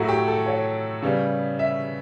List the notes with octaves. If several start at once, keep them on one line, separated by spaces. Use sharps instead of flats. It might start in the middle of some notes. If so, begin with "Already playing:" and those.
Already playing: A2 F#3 A3 F#4
G4
A4
C#5
C#3 G3 B3
E5